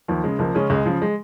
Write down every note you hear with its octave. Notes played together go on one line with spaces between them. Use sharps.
D#2 F3
C#3 G#3
C#2 F3 A#3
C#3 G#3 C#4
C#2 G#3
C#3 F3
G#3